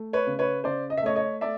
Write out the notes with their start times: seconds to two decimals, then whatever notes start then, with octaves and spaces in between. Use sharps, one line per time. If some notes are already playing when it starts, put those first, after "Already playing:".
Already playing: A3
0.13 B4 C#5
0.27 C#3
0.39 B4 C#5
0.64 C#3 C5 D5
0.90 D#5
0.97 E5
1.02 A3 C#5 D#5
1.15 C#5 D#5
1.41 A3 D5 E5